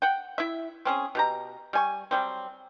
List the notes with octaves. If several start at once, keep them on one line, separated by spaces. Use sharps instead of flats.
F#5 G5
E4 E5
C4 C#4 G#4
B2 G4 A#5
G3 G#5 C#6
F#3 G3 C4